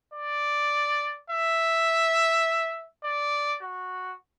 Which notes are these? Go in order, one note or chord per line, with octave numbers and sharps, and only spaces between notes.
D5
E5
D5
F#4